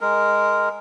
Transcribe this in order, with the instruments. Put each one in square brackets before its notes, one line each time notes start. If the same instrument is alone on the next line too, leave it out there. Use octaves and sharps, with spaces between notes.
[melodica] G#3 A#4